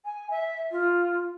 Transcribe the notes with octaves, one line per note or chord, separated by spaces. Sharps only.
G#5
E5
F4